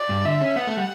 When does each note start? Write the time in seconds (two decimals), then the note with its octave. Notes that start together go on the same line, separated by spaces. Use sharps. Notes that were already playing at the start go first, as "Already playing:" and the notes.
Already playing: D5
0.09 G2
0.25 D3 E5
0.41 C#4
0.56 B3 F#5
0.67 A3
0.77 G3